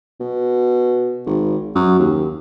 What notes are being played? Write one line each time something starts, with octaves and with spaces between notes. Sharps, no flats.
B2
G#1
F#2
D#2